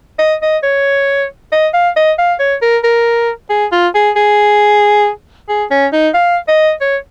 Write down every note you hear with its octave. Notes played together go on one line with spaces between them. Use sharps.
D#5
D#5
C#5
D#5
F5
D#5
F5
C#5
A#4
A#4
G#4
F4
G#4
G#4
G#4
C#4
D#4
F5
D#5
C#5